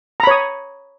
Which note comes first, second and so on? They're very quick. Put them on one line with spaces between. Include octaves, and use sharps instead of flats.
A#5 B5 C#5 D#6